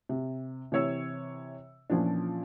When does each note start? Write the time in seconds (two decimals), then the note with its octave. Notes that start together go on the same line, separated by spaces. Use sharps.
0.09 C3
0.72 C3 E3 C#5 E6 C#7
1.90 A#2 E3 F3 C#4 D4